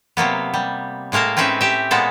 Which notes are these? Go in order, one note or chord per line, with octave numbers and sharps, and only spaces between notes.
C3 F#3 A#3 B3
G3
A2 G#3 A#3 A#4 A5
C4 C#4 D#4 B4 E5
G4 E5
A#2 G#3 B3 A4